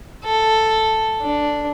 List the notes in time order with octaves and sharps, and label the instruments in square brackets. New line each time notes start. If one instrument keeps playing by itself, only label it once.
[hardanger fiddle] A4
D4